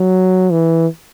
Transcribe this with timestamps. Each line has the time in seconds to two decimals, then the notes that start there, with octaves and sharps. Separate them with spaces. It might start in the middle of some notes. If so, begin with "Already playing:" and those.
Already playing: F#3
0.52 E3